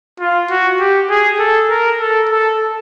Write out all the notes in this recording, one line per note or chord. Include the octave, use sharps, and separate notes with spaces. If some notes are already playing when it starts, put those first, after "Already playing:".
F4
F#4
G4
G#4
A4
A#4
A4
A4